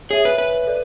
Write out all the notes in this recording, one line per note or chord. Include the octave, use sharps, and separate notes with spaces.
G#4 C#5 E5 G#5
B4
B4
A4 D5